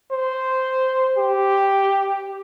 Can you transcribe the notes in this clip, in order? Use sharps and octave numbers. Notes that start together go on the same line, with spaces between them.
C5
G4